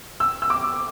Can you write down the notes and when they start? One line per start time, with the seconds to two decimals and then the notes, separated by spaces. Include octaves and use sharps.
0.20 E6
0.42 E6
0.50 D6